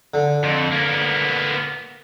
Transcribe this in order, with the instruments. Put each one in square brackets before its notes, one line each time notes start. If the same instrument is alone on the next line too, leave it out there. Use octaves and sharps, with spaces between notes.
[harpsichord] D3
[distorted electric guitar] F2
A#3 B3